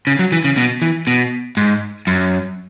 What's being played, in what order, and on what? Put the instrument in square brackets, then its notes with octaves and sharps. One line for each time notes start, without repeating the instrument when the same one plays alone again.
[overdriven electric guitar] C#3
F#3
E3
C#3
B2
E3
B2
G#2
F#2